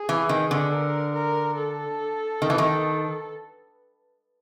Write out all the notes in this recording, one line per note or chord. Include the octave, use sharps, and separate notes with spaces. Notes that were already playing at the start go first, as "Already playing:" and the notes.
Already playing: G#4
E3
D#3
D3
A#4
A#4
A4
D#3
E3
D#3